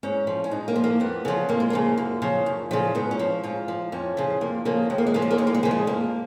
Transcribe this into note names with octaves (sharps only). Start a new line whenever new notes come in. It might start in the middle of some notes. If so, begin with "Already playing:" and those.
G#2 C#4
F3
C#4
G#2 D#4
A#3
F3
A#3
F2 B3
C#3 F3
F2 A#3
G#3
C#3 F3 A#3
F#2
C#3 F3
F#2
C#3 F3
G#2 B3
C#4
F3
G#2 F4
F3
F2 C#4
C#3 F3
F2 A#3
C#3 F3 A#3
D#2 G#3
A#3
G#3
C#3 F3 A#3
G#3
A#3
D#2 G#3
A#3
G#3
C#3 F3 A#3
G#3
F2 A#3